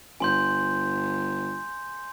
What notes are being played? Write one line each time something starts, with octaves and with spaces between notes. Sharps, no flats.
G1 G#5 C6 G6